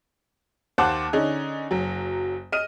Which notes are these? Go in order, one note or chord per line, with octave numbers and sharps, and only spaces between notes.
D#2 C5 F#5 A5 D6 F#6
D3 C#4 D#4 G#4
F#1 F#3
D#5 F6 D#7